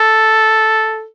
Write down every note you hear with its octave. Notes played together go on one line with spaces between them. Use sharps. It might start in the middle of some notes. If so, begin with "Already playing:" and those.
Already playing: A4